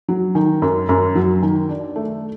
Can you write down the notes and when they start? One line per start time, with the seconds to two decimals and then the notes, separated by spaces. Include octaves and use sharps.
0.08 F#3
0.35 D#3
0.62 F#2
0.89 F#2
1.15 F#3
1.43 D#3
1.69 D4
1.96 A3